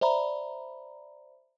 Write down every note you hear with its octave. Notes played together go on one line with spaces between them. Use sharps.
C5 D5 E5 A#5 B5